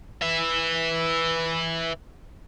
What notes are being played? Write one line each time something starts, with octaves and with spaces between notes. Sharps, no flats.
B4 E5